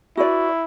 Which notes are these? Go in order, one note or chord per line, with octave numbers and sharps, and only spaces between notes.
E4 F#4 B4 D5